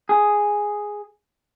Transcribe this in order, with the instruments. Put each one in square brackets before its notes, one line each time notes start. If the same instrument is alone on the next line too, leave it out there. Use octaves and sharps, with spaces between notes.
[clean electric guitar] G#4